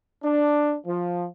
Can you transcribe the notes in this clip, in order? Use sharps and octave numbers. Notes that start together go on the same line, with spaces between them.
D4
F3